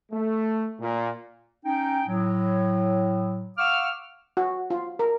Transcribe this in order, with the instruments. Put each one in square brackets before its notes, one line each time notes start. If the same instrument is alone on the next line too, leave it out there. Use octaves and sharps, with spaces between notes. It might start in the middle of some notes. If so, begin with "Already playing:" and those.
[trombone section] A3
A#2
[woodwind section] C#4 D#4 G5
A2 F#3
F5 F#5 C#6 D6 E6 F6
[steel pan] F#4
F4
A#4